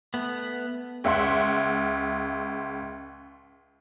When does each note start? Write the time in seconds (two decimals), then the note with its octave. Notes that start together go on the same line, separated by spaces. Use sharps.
0.14 A3 B3
1.04 C#2 E5 F#5 C6